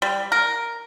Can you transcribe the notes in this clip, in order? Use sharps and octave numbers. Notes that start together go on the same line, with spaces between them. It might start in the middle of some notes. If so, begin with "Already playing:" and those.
G3
A#4